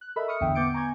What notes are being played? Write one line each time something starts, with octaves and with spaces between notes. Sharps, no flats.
F#6
A4 A#4 D#5 E5 B5
C#6 D#6 F6 C#7
A1 E2 D3 E5 G5 D#6
B3 D6 G6 A6 C#7 D7
G#5 A#5 C#6 G6 G#6